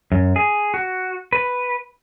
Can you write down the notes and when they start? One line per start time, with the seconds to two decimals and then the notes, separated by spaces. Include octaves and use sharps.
0.12 F#2
0.36 G#4
0.74 F#4
1.33 B4